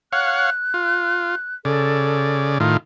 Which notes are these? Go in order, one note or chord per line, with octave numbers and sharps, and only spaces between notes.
C#5 F5 F#5 F#6
F4
C#3 A4 D5
A2 D#3 F4